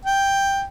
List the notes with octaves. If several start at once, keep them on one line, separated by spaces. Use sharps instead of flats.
G5